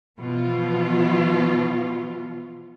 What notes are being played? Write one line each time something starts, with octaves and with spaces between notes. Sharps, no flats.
B2 E3 F3 B3 F4